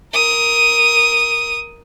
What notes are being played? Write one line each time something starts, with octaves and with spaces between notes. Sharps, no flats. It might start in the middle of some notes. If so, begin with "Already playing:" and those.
A#4 D#6